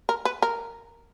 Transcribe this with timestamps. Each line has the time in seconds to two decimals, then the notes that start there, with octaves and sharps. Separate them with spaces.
0.09 A#4
0.25 B4
0.42 A#4